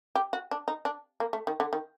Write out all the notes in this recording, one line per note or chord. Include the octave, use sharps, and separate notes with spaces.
G4
F#4
D4
D#4
D4
A#3
A3
D#3
D3
D#3